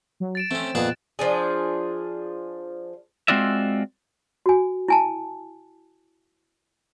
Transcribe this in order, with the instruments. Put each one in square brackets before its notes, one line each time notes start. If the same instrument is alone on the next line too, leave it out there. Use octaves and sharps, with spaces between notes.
[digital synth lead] F#3
[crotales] A6 D7 E7
[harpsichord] A3 C#4 [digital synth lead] C4
[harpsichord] F2 G#4 A5 [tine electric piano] A#2 B3 F4 [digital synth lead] F#6
[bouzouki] F3 D4 G#4
[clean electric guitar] G#3 C4 F4 F#4 D5 E5
[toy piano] F#4 G#5
E4 G#5 A5